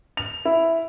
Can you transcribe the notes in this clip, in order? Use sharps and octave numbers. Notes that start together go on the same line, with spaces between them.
F7
E4